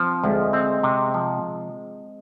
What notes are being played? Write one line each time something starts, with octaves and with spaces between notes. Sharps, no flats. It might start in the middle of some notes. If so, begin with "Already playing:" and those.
Already playing: F3 C4
D2 G#3
C4
C3
F3